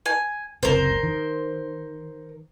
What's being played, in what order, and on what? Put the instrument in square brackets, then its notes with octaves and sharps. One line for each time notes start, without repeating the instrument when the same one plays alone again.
[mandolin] G#5
[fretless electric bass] F#1 C#2 C3 [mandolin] A#4 C5
[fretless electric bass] D#3